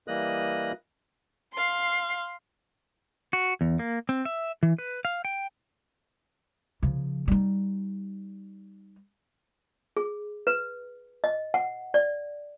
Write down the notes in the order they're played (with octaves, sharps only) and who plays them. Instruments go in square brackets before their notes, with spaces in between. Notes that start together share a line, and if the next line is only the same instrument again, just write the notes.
[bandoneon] E3 G3 A#3 D#5 D#6 F#6
[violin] F5 C6
[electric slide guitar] F#4
E2
A#3
C4
E5
E3
B4
F5
G5
[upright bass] C#3 F3
G3 D#4
[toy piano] G#4
B4
D#5
F#5
D5